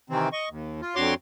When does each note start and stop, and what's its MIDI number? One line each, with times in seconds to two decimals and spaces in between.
0.10 0.29 48
0.10 0.29 51
0.10 0.29 52
0.10 0.29 60
0.33 0.49 75
0.33 0.49 85
0.50 0.81 39
0.82 0.95 65
0.95 1.14 41
0.95 1.14 50
0.95 1.14 66
0.95 1.14 73
0.95 1.14 84
0.95 1.14 86